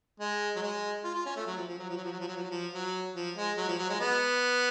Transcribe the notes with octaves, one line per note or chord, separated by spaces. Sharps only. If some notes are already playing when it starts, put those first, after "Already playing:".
G#3
F#3
G#3
F4
F4
C#4
A3
F#3
F3
F3
F#3
F3
F#3
F3
F#3
F3
F#3
F3
F#3
F3
F#3
F3
G#3
F#3
F3
F#3
G#3
B3